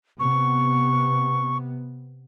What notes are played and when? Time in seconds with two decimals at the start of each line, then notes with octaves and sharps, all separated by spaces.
0.20 C3 B3 C#6